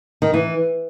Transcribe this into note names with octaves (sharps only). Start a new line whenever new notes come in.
D#3
E3